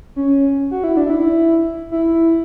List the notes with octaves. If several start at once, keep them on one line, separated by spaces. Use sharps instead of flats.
C#4
F#4
E4
D4
E4
E4